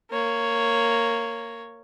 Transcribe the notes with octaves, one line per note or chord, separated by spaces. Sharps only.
A#3 C#5